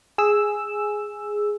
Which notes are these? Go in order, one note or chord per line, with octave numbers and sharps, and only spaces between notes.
G#4 E6